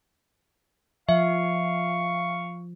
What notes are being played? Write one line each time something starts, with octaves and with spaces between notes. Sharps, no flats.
F3 E5 F5 C#6